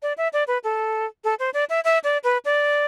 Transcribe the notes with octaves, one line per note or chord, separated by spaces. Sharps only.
D5
E5
D5
B4
A4
A4
C5
D5
E5
E5
D5
B4
D5